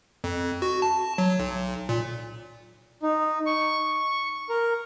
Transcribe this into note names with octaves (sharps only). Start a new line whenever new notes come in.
F2
F#4
A5
F#3
B1
A#2
D#4
C#6
A#4